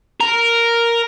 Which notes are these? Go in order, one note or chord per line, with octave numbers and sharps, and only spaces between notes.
A#4